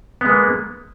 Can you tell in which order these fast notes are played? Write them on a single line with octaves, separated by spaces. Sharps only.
B3 G#3 A#3